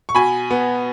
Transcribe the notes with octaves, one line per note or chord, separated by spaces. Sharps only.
C#6
B2 G#5 B5
B3